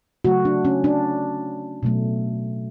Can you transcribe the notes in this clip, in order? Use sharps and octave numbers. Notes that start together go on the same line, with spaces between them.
C#3 F#3 A3 F#4
D4
C#4
D4
B2 F#3 A3